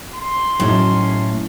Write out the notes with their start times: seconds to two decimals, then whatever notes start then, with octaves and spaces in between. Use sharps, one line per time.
0.15 C6
0.60 A2 F#3 C#4 D#4